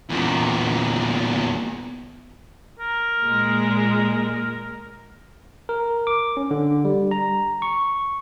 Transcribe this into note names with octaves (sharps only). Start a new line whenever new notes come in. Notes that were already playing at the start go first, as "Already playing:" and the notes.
E2 A#2
A#4
A#2 G#3
A#4
D6
C#4
D3
G3
A#5
C#6